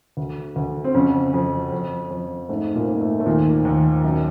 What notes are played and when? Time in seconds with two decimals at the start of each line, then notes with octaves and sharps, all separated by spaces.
0.17 D2
0.56 D2
0.85 C4
0.94 F2 C#3 C#4
1.34 F2
1.72 F2
2.11 F2
2.49 G#2 A3
2.75 A#2 A#3
2.87 G#2
3.00 A3
3.20 A3
3.26 D#2 A#2 A#3
3.65 D#2
4.03 F#2